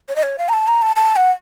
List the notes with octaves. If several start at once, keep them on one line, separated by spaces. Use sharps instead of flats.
C#5
D#5
C#5
F5
A#5
A5
A#5
A5
A5
F#5